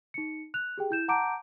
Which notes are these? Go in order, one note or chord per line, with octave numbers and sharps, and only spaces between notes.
D#4 C#7
F#6 F7
G4 G#4 G5
E4 G6 E7
F#5 A5 A#5 D6 G6 D7